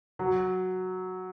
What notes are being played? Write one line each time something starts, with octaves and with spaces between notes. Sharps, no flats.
F#3